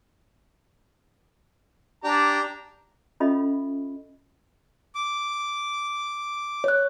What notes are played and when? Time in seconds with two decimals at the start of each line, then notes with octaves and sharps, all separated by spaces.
2.04 D4 G4 A#5
3.20 C#4 F4 A4 D#5 E5 B5
4.95 D6
6.64 C#5 F#6